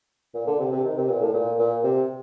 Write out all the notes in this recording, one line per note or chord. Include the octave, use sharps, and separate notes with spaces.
A#2
D3
C3
C3
D#3
C3
A#2
A2
A#2
A#2
C3